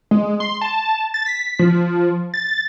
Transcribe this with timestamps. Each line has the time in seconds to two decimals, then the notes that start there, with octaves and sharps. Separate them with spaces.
0.11 G#3
0.40 C6
0.61 A5
1.14 A6
1.26 B6
1.59 F3
2.34 A6